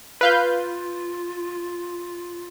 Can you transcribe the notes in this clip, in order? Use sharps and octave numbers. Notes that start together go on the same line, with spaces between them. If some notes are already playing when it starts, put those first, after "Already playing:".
F4 B4 F5 G6